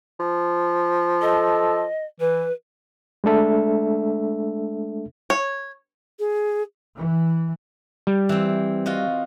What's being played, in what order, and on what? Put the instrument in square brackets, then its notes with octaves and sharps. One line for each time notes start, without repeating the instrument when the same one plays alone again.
[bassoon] F3
[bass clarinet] A4 [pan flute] D#5
[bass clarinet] E3 [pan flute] B4
[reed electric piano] G#3 A3 D4 A4 E5
[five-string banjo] C#5
[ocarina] G#4
[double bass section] E3
[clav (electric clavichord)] G3
[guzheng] E3 C4
F4 F#4 D#5